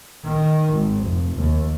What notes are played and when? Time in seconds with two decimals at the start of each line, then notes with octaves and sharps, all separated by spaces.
0.25 D#3
0.73 G#1
1.04 F1
1.36 D#2